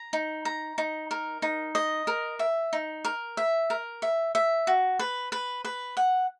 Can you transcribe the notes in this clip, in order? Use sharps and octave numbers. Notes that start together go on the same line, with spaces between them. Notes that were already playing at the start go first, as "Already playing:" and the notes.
Already playing: A#5
D#4
A#5
D#4
A#4
D#4
D#5
A#4
E5
D#4
A#4
E5
A#4
E5
E5
F#4
B4
B4
B4
F#5